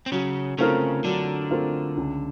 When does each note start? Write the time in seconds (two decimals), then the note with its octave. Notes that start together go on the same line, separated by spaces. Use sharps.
0.06 C4
0.12 C#3 F#3 C#4
0.58 C#3 A3 C4 C#4 F4 A#4
1.04 D3 F#3 D4
1.51 A3 C4 F4 A#4
1.97 C#2